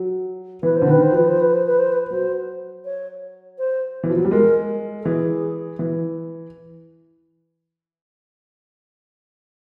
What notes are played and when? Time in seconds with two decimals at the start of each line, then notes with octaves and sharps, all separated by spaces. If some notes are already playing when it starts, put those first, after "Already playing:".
Already playing: F#3
0.62 E3 B4
0.76 C5
0.82 D3
0.87 D#3 B4
1.01 C5
1.12 F3 B4
1.28 C5
1.40 B4
1.53 C5
1.66 B4
1.78 C5
1.92 B4
2.10 F#3 C5
2.85 C#5
3.58 C5
4.03 E3
4.10 F3
4.18 F#3
4.25 G3
4.31 G#3 A#4
5.01 A4
5.05 E3 G#4
5.79 E3